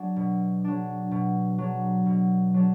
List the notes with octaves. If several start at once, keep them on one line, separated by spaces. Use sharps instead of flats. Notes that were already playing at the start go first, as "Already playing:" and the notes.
Already playing: F#3 D4
B2
F#3 D4
B2
F#3 D4
B2
F#3 D4